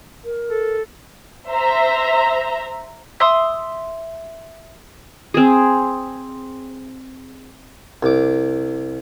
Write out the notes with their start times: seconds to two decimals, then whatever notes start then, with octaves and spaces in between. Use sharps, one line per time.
0.25 A#4
0.50 A4
1.49 C5 E5 A#5
3.20 E5 C6 D#6
5.34 C4 G#4
8.03 C2 D6